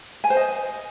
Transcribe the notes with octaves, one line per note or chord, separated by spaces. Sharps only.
G#5
C5
D#5